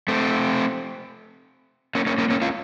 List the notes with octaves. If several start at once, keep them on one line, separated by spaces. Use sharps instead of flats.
A3 C4
A#3 C#4
A#3 C#4
A#3 C#4
A#3 C#4
C#4 F4